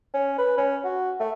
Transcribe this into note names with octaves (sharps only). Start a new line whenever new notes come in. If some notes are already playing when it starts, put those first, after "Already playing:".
C#4
B4
C#4
F#4
A3